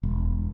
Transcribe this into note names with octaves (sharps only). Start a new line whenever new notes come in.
E1